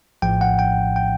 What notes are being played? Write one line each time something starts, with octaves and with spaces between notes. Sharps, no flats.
A#1 A2 F3 G5
F#5
G5
G5